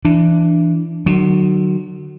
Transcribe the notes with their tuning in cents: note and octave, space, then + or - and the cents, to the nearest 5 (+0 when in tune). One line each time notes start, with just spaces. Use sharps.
E3 +20 D4 +5
D3 +45 F#3 +0